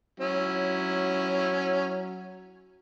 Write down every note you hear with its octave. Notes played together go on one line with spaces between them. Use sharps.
F#3 C#4 E4